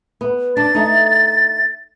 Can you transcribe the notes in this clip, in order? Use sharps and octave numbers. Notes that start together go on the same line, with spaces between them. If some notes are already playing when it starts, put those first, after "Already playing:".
B3
D4 A6
A3 D#4